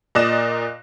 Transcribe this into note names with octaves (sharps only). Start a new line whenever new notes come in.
A#2 D5 D#5 F#6 A#6 E7